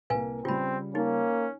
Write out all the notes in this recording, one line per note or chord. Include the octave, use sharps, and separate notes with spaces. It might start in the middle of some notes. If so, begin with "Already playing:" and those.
C2 A#3 B4 F5 G#5
C#3 G3 C4 F4 B5
A#3 C#4 D#4